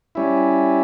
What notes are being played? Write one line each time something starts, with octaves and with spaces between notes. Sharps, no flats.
G3 C#4 E4